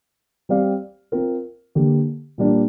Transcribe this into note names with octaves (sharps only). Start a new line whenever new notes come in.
G3 C4 G4 D5 F5
C4 F4 A#4
D3 A#3 G4
A#2 G3 A#3 D4